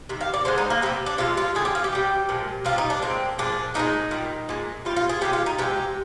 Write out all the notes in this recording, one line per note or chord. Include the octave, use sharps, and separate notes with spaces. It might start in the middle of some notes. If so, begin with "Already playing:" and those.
C3 D#3
F5
D5
D3 G#3 C5
D#4
A#3
C3 G3 C4
D4
C3 F3 G#3 F4
F4
D3 G3 G#4
G4
F4
G4
C3 G3
A#2 F3 G#3
C3 G3 F4
D#4
D4
A#2 G#3 C4
A#2 F3 G#3 D4
A#2 F3 G#3 D#4
A#2 G3
A#2 G#3
A#2 G3 F4
F4
G#4
C3 D#3 G#3 G4
F4
D#4
C3 F3 G#3 G4